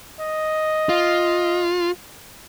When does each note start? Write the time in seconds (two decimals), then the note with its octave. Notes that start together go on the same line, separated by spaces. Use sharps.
0.20 D#5
0.89 F4